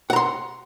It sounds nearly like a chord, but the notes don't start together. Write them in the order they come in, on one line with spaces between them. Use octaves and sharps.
F#5 A#5 C6